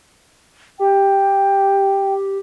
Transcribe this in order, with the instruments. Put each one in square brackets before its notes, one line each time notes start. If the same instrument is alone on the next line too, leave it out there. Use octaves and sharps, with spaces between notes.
[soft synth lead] G4 [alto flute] G5